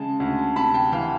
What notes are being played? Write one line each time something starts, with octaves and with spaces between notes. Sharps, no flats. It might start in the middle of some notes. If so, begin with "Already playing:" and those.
Already playing: C#3 G#3 A5
D2
C3 A5 B5
G5 A5
E3 F5 G5